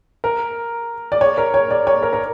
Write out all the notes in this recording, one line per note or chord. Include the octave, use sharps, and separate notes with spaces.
A#4
D5
C#5
A#4
C#5
D5
C#5
A#4
A#4